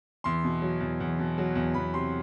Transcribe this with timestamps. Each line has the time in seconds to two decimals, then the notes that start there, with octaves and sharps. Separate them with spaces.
0.24 E2 C6
0.44 B2
0.62 F#3
0.80 E2
1.00 E2
1.19 B2
1.38 F#3
1.55 E2
1.74 E2 B5
1.93 C3 C6